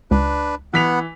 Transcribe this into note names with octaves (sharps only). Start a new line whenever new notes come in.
C#2 D4 B4
E3 B3 F#5 B6 F7